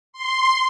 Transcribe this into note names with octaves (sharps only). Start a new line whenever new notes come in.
C6